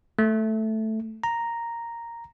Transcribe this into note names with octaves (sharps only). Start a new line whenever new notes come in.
A3
A#5